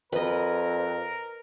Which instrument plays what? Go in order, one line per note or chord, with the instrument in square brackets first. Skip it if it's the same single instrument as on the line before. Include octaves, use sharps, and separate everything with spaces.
[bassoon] F2 [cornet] A#4 [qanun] B4 D#5